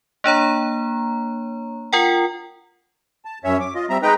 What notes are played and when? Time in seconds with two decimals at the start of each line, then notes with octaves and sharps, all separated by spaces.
0.24 A#3 D4 C#5 A#5
1.93 F4 A#4 F#5 G5
3.25 A5
3.44 F#2 C#4 C#5 E5
3.60 D6
3.75 F4 D#5
3.90 G3 C4 E5 A#5
4.03 G#3 D#4 B4 G5 A#5